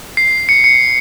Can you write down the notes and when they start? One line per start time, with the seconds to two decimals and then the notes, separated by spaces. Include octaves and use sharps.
0.17 C7
0.49 C#7
0.64 C#7